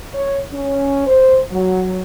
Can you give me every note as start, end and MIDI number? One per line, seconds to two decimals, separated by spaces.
0.14 0.39 73
0.52 1.04 61
1.07 1.39 72
1.50 2.02 54